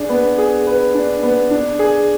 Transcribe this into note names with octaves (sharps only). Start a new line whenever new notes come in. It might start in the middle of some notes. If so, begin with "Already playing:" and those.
Already playing: D4 G#4
B3
G#4
B4
D4
B3
D4
G#4